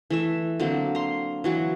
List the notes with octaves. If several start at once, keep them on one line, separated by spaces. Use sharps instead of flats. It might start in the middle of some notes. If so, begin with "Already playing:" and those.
E3 A3 E5
D3 F#3 A#3 C4
A#5 C6
E3 F#3 F#4